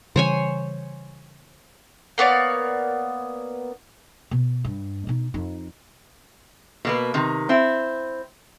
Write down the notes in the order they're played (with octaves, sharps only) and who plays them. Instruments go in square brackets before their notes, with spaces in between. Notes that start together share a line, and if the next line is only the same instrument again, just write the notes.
[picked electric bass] C#3 E3 G3 [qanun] C5 C#5 G#5
[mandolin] A#3 B3 C#5 D5
[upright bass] B2
G2
B2 D#4
F2 D#4
[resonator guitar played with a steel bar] B2 A#3 B4
C3 D#3
C4 E4